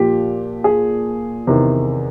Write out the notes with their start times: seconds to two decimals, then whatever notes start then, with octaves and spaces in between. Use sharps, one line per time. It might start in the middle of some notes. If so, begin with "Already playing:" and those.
Already playing: A#2 F3 G4
0.64 G#4
1.47 E2 C3 D#3